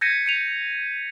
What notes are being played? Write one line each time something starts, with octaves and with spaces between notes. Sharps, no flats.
G6 G#6 A#6 B6 C#7 D#7
C#7 D#7 F7